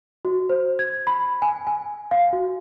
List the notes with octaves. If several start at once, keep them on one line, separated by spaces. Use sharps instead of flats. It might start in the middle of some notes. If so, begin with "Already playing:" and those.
F#4
C5
G#6
B5
G#5
G#5
F5
F#4